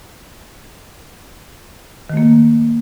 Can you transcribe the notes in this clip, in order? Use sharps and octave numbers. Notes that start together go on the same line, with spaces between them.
D#3 A3 A#3